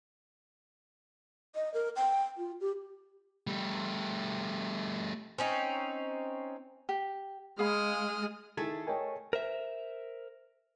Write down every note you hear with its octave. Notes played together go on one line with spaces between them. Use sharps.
D#5
A#4
G5
F4
G4
G3 A3
C4 C#4 D#4
G4
G#3 G#4 F5 B5 D#6 F6
D#3 A3 E4 G#4 A4 G#6
A#4 C#5 D#5 G5 G#5
A#4 C5 E5